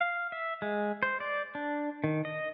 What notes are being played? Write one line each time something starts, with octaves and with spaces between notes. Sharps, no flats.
F5
E5
G#3
C5
D5
D4
D#3
D#5